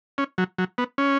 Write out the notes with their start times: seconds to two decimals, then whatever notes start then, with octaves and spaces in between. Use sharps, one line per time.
0.18 C#4
0.38 F#3
0.58 F#3
0.78 B3
0.98 C#4